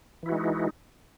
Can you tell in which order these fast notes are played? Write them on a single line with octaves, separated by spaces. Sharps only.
E3 E4 F#4 G#3 D#4